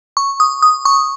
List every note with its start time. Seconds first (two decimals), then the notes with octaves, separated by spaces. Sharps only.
0.17 C#6
0.40 D#6
0.62 D#6
0.85 C#6